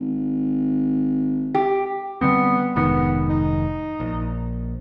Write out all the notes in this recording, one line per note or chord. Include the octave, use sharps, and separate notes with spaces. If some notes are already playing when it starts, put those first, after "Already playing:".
G#1
G4
D3 G3 B3 C4
F1 G#2 D#3 B3
D#4
A#1